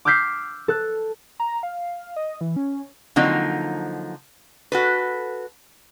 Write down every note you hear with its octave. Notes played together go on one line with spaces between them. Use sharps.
D6 E6 F6 G6 B6 C7
A4 F#6
A#5
F5
D#5
E3
C#4
D3 F3 F#3 A#3 C4 D#4
F#4 A4 B4